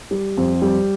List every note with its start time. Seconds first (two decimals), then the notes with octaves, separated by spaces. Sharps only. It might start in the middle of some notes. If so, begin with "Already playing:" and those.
0.11 G3
0.37 F2
0.62 G3